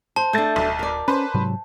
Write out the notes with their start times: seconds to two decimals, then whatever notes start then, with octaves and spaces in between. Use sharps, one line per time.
0.16 C5 A5
0.33 A3 D4 G6 A6
0.56 D1 B1
0.79 A#4 D5
1.08 C#4 B4 C5
1.34 G#2 C3 F#3